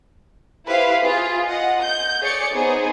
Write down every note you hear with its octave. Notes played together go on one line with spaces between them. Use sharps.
E4 G4 B4 C5 F5
F4 G#4
D#5 F#5
G6
G#4 C#5 D5 C#7
B3 D#4 G#4 C5